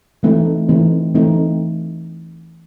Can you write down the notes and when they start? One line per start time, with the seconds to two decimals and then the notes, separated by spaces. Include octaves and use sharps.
0.23 E3 A3 C4 D#4
0.69 E3 A3 C4 D#4
1.15 E3 A3 C4 D#4